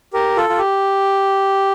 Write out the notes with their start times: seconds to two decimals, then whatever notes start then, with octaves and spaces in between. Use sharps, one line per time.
0.13 G4 A#4
0.37 F4 A4
0.49 F4
0.58 G4